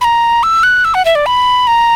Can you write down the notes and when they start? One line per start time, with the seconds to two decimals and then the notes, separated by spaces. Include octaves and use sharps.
0.01 B5
0.04 A#5
0.43 E6
0.63 F#6
0.85 E6
0.94 F#5
1.05 E5
1.15 D5
1.26 B5
1.67 A#5